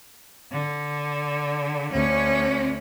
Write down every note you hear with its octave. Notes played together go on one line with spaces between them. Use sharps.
D3
D2 C#4